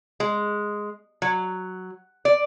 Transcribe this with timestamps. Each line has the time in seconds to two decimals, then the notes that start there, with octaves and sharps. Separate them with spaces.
0.20 G#3
1.22 F#3
2.25 D5